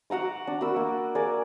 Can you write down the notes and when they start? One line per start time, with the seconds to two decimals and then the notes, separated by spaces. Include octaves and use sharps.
0.10 F#4 F#5 A#5 D6
0.47 D4
0.61 F#4 A#4 B5 E6
0.76 A#3
1.15 G#4 A#4 D5